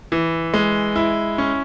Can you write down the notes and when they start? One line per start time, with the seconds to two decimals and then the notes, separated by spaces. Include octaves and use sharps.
0.12 E3
0.54 G#3
0.96 E4
1.38 C#4